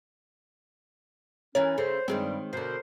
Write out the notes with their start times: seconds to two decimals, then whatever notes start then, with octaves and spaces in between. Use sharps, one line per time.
1.55 E3 C#4 E4 A#4 C#5
1.78 C#3 A3 C5
2.08 G2 D#3 G3 G#3 C4
2.53 B2 D3 A#4 C5